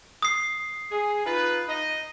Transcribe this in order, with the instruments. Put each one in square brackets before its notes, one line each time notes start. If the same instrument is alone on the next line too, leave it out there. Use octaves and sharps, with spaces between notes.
[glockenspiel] D#6 C7
[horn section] G#4
D#4 F4 B4
D#4 D#5